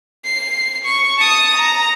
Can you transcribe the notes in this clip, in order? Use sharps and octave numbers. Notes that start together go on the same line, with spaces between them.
C7
C#6
A5 D#6
A#5